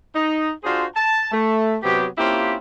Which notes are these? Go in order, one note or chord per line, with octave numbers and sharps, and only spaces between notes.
D#4
D4 F4 F#4 G#4 C5
A5
A3
C3 F#3 B3 G4
A#3 C4 C#4 E4 F4 G4